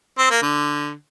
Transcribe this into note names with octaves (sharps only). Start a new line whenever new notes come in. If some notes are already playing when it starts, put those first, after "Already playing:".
C4
A#3
D3